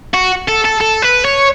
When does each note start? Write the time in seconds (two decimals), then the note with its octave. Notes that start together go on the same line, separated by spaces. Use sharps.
0.14 F#4
0.48 A4
0.64 A4
0.80 A4
1.02 B4
1.25 C#5